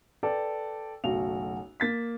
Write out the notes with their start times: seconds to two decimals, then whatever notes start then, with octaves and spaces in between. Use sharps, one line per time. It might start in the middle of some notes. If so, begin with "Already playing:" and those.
0.23 A4 B4 D5 G5
1.04 F#1 B1 F#3 A3 F#4 F7
1.80 A#3 A6 B6